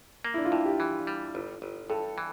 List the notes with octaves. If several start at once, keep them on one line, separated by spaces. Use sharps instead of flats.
A#3
E4
D4
F4
G2 E4
G4
E3
G3
G1
G1
G2 A4
E3